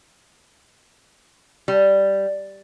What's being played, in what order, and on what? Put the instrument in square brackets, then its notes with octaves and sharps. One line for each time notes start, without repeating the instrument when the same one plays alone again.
[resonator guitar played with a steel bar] G3